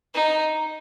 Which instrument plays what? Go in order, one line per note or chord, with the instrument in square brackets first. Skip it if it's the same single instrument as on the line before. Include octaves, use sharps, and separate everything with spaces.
[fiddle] D#4